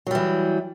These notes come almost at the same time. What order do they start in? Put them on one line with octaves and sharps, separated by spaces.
F#3 G3 E3